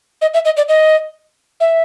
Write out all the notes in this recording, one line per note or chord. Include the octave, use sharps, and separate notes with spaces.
D#5
E5
D#5
D5
D#5
E5